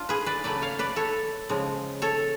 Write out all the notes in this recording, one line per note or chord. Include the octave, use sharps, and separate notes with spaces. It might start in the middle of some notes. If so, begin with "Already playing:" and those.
Already playing: D4 F4
G#4 B4
B4 D5
C#3 F#3 A3 B4 D5
C#5 F5
B4 D5
A4 C#5
C#3 F3 G#3
A4 C#5